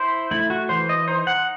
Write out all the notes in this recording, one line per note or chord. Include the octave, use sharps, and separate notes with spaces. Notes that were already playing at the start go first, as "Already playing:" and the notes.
Already playing: E4 C5
A3 E4
F#4
E3 C5
D#5
D#4 C5
F#5